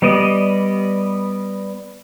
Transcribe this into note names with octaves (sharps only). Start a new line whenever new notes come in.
G3 B3 D5 D#5